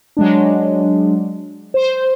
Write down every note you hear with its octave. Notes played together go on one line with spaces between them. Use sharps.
F#3 G#3 D4
C5